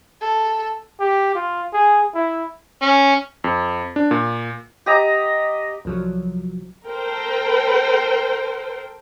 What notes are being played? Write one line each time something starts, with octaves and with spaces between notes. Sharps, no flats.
A4
G4
F4
G#4
E4
C#4
F2
D4
A#2
G4 D#5 A#5
C2 F3 F#3
A4 A#4 C5 G5